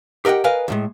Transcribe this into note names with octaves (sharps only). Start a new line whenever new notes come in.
G4 A#4 D#5 F#5 G5
A#4 B4 D#5 F5 G#5
D2 A2 G#3